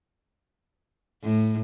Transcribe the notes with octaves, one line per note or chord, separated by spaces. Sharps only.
A2